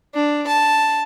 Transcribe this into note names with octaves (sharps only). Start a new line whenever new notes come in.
D4
A5